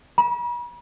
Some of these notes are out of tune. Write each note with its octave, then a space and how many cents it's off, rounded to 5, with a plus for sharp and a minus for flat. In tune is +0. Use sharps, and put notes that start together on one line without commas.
B5 -45